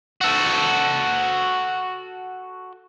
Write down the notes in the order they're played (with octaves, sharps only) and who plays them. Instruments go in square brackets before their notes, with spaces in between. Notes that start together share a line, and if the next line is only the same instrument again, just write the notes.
[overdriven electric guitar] F#4 A4